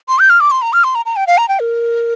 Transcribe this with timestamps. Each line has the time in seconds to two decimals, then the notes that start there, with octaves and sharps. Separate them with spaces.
0.08 C6
0.19 G6
0.30 F6
0.40 D6
0.51 C6
0.62 A#5
0.73 F6
0.84 C6
0.95 A#5
1.06 A#5
1.16 G5
1.27 F5
1.38 A#5
1.49 G5
1.60 A#4